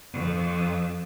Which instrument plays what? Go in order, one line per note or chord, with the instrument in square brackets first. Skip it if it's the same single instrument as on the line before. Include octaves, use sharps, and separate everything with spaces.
[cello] F2